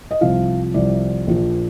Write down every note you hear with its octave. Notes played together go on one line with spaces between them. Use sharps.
D#5
C2 C3 F3 F5
C2 C3 F3 D5
A#1 A#2 F3